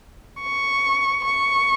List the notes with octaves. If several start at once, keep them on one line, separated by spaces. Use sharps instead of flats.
C#6
C#6